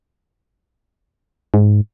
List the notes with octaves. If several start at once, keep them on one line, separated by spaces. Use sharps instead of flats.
G#2